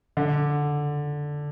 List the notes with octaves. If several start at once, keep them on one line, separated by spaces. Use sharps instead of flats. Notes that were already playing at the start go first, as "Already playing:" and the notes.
D3